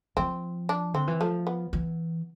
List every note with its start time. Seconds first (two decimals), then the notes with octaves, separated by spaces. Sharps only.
0.17 F3 C4
0.69 D4
0.94 D3 C4
1.07 E3
1.21 F3 A3
1.47 B3
1.73 E3